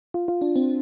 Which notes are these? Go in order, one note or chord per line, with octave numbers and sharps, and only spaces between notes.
F4
F4
D4
C4